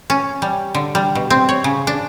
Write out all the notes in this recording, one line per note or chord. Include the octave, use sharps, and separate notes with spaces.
C#4
G3
D3
G3
B2
C4
C#5
C#3
D4